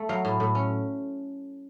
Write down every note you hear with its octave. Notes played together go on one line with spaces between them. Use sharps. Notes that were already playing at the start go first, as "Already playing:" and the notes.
Already playing: A3
F#3 F5
A2
A2
C#4